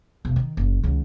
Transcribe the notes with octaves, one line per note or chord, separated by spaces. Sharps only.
E1
D#3
F#1
C#2 D#3